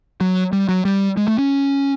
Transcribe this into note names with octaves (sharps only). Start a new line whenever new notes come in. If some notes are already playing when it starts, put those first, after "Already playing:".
F#3
G3
F#3
G3
G#3
A3
C#4